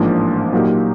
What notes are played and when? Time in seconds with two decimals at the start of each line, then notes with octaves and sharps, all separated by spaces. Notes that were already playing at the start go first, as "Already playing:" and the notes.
Already playing: A1 G#2 F3 A#3 D4
0.53 A#2 F#3 A#3 D#4 G4